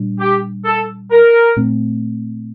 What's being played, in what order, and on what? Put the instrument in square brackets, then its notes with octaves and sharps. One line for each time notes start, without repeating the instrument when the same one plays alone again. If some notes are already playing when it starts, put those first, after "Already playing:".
Already playing: [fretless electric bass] A#2 G3 D4
[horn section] G4
A4
A#4
[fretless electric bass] A#2 A3 C4